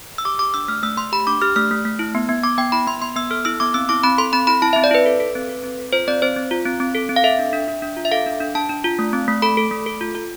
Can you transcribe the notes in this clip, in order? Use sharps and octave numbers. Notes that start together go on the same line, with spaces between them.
E6
G4 D6
G4 D6
D4 E6
A3 F6
A3 E6
A3 C6
G4 B5
D4 D6
G4 F6
A3 F6
A3
A3
E4
B3
B3
B3 D6
B3 G5
E4 B5
B3 C6
B3 C6
B3 E6
A4 F6
E4 E6
B3 D6
C4 E6
E4 D6
C4 B5
A4 C6
C4 B5
E4 B5
E4 A5
C4 E5
D5
E4 B4
A4
A4
C4
A4
C4
A4
F4 C5
C4 D5
C4 C5
C4
F4
C4
C4
A4
C4
F5
A4 E5
D4
D4
D4
D4
F4
E5
A4 F5
D4
D4
D4 A5
D4
F4
A3
C4
A3
A4 B5
A4
A3
A4
F4
F4